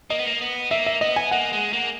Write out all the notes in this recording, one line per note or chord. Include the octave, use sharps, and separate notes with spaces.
A#3 D#5
B3
A#3
B3
A#3 E5
E5
B3 D#5
G#5
A#3 F#5
G#3
A#3